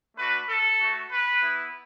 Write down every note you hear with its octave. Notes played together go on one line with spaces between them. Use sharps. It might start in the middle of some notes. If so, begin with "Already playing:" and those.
A3 D4 F#4 B4
A4
A3 F#4
B4
B3 E4